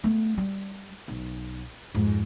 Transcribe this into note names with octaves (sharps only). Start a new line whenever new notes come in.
A3 B3
G3
B1
F2 G#2